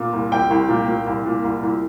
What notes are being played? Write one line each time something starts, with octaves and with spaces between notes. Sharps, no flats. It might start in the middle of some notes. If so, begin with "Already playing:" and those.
Already playing: A#2
C2
C2 G5
C2
A#2
A#2
C2
A#2
C2
C2